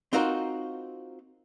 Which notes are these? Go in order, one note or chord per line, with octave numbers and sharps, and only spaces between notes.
C4 D#4 F4 F#4 A#4 C5